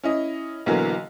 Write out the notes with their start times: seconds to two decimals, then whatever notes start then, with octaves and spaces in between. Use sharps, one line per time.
0.03 C#4 E4 D#5
0.66 B1 D3 E3 F#3 A#3